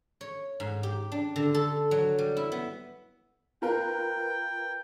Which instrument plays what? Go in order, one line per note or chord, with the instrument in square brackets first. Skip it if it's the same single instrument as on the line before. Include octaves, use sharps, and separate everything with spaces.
[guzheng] C#5
G#2
G4
D4
D3
A4
F#3
G3
E4
B3
[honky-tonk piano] F4 A#4 B4 [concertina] G5